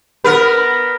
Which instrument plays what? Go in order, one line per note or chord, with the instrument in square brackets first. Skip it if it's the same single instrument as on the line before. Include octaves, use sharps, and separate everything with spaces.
[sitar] B3 A#4 B4